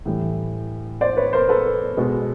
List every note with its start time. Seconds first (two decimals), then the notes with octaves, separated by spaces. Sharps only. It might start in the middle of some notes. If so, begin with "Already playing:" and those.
0.06 A2 E3 G3
1.01 C5 D5
1.17 B4 C#5
1.33 A#4 C5
1.49 A4 B4
1.97 B2 G#3 B3